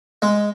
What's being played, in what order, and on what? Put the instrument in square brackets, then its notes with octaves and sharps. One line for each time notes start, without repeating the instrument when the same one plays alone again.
[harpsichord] G#3